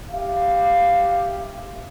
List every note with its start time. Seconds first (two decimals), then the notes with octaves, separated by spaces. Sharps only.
0.11 G4 E5 F5